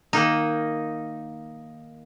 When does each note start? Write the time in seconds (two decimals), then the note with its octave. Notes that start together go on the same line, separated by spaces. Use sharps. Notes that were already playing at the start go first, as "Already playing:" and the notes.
0.13 D#3 A#3 D#4